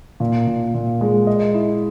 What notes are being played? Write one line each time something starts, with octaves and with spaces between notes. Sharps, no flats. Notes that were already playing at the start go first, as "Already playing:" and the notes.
A#2
A#2
A#2
G#3
D#5
E4